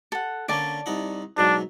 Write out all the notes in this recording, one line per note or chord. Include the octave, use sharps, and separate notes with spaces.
A4 F#5
D3 A#3 C#4 D5 A5
C2 D#4 F#5
G#2 B2 F#3 D4